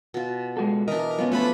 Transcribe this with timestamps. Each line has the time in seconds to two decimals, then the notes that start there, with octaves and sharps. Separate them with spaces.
0.14 B2 F4
0.57 G#3 F#4 A4
0.88 E3 D4 A#4 D#5
1.18 F#3 B3 C#4 F4
1.32 F3 A3 D4 B4 B5